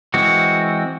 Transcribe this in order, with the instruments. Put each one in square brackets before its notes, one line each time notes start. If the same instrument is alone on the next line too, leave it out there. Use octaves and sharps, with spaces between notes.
[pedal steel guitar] E3 G#3 C4 F#4